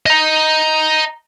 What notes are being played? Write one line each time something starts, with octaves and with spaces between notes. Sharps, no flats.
D#5 A#5